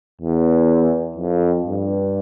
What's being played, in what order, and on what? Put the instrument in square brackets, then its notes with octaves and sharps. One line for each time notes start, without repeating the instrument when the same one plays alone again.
[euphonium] E2
F2
G2